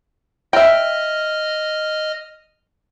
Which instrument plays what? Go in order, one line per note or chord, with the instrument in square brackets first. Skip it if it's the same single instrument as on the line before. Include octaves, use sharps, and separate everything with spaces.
[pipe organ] D#5 F6 [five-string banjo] E5 G5